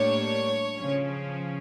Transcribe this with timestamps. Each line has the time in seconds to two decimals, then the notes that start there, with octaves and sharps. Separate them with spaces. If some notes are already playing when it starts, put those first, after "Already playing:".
Already playing: A2 G3 A#3 D4 C#5
0.75 C#3 F3 C#4